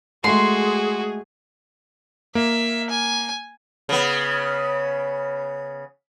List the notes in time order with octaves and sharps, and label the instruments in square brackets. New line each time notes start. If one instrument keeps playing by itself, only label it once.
[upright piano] G#3 A3 [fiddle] F#4 [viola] G#4 [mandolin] C6
[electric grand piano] A#3 [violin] E5
[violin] G#5
[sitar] C#3 B3